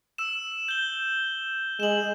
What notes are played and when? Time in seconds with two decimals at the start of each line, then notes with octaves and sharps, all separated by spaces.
0.18 E6 E7
0.68 G6 G7
1.80 G#3 E7 F#7